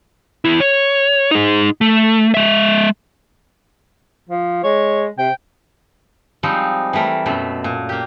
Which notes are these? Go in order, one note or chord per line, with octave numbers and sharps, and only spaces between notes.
E2 E4
C#5
D#4 G#4
A3
G#3 E5
F3
G#3 C#5
C3 G5
F3 G3 G#3 C4 D#4
E3 G3 A3 A#4
F#2 B2 A3
A#2
A#3 G4